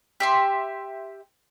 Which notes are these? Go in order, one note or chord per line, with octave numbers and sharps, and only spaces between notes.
G4 E5 C6